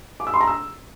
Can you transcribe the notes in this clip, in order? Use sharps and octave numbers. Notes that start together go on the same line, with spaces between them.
D6
E6
C6
A#5
E6